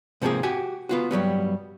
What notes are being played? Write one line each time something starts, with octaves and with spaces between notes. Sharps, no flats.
G#2 C3 F3 G#3 A#3 G#4
F#4 G4 G#5
B3 F4 F#4
G2 F#3 G3 B3